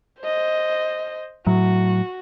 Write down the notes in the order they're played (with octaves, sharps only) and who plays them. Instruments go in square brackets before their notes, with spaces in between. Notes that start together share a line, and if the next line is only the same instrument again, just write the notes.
[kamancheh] C5 D#5
[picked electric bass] A2 F#3 [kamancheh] F#4